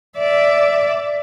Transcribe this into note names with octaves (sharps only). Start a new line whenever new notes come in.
D5 E5